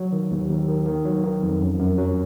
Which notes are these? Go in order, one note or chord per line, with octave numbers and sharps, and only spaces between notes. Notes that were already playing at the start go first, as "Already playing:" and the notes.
Already playing: F#3
D#3
D#2
D#2
D#3
D#3
F#3
D#3
F2
F#2
F#2
F#3